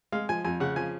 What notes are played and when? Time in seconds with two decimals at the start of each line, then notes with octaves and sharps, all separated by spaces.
0.12 G#3 F5
0.29 F3 G#5
0.44 F2 G#5
0.60 C#3 F#5
0.76 F3 G#5